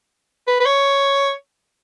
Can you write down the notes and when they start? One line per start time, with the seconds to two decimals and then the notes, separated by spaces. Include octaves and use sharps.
0.48 B4
0.60 B4
0.66 C#5